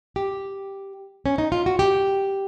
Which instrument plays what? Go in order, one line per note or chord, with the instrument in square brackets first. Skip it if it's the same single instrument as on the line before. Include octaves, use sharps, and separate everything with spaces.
[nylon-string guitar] G4
C#4
D#4
F4
F#4
G4